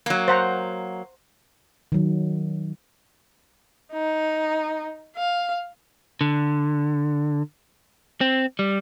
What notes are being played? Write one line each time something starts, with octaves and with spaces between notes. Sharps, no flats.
F#3 A#3
C5 F#5 A#5
D#3 F#3
D#4
F5
D3
C4
G3